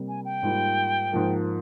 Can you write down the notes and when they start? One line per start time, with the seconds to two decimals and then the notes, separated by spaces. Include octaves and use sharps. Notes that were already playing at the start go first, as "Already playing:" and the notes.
Already playing: C3 G3 A#3
0.08 G#5
0.25 G5
0.43 G#2 G3 A#3 F4
1.12 G#2 F3 A#3